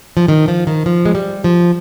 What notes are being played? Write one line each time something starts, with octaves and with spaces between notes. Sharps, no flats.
F3
D#3
F3
D#3
F3
G#3
G3
F3